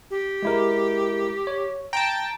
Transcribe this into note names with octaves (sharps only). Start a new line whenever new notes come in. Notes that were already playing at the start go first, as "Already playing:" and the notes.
G4
G#3 E4 A#4
C#5
G5 A5 A#5